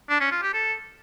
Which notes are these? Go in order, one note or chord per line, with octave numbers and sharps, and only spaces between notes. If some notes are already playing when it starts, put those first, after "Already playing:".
D4
C#4
F4
G4
A4